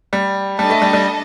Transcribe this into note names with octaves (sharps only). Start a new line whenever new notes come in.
G3
G3 D4 A4 D#5 A5
A3
G3
G3